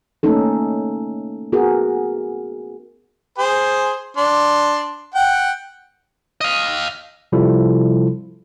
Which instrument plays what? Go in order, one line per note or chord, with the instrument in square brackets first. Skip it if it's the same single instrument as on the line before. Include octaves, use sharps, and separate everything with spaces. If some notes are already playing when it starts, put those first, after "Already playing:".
[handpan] A3 A#3 C#4 D#4 A4
B3 F#4 G#4 A#4
[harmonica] G#4 C5
D4 C6
F#5 G5
[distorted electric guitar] D#5 F5
[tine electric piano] C3 F3 G3 E4 F4 A4